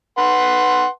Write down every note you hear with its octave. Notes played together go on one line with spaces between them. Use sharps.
B4 F#5 C6